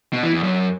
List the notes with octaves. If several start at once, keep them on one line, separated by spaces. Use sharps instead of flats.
B2
E3
E2
F#2